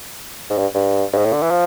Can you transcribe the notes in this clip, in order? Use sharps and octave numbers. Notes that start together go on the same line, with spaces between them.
G#2
G2
G2
G2
G#2
A2
D3
E3
F3